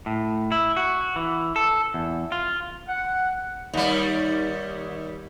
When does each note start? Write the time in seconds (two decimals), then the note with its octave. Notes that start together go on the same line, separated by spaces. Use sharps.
0.06 A2
0.52 E4
0.77 F#4
1.16 E3
1.56 A4
1.94 E2
2.32 F4
2.88 F#5
3.73 D#2 G3